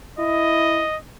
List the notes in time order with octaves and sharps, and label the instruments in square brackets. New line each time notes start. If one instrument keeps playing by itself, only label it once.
[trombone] E4 [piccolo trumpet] D#5